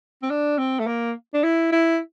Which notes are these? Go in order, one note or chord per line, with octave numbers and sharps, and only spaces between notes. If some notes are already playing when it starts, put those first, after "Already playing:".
C4
D4
C4
A3
A#3
D4
E4
E4